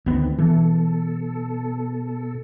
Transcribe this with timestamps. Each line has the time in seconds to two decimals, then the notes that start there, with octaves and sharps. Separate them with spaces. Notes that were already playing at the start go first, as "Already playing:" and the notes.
0.06 D2 D#3 B3 C4
0.39 B2 E3 A4